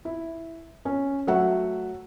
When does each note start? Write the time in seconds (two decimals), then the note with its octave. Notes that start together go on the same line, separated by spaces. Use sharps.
0.05 E4
0.85 C#4
1.27 F#3 A3 E5 F#5